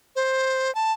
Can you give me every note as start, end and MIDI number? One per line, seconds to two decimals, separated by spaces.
0.16 0.73 72
0.75 0.92 81